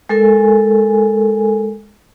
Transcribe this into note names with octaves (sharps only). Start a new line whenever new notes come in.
G#3 A4 A#4 G#5